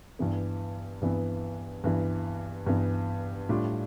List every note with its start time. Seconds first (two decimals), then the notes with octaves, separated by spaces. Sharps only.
0.19 G2 E3 B3
1.02 G2 E3 B3
1.84 G2 E3 B3
2.66 G2 E3 B3
3.49 A2 G3 D4 F4